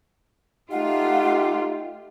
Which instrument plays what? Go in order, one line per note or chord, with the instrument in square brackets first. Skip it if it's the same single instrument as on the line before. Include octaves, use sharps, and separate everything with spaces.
[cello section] A3 F4 [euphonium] D#4 [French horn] G4 [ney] F#5